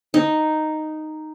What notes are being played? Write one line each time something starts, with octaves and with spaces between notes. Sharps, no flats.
D#4